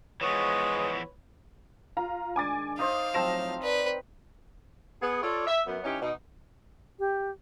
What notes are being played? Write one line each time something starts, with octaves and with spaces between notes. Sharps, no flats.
E3 F3 G#3 B3 B4 C#5 C#6 D#6
F4 A#5
D#3 G#3 D4 G#5 D6 A6
D#4 C5 F5 D#6
A2 F3 F#3 C4 G5 A5 A#6 E7
B4 D5
B3 G#4
F4 A4 C#5 D5
E5
F#2 B3
E3 C#4 D#4 G4 C#5
B2 D#4
G4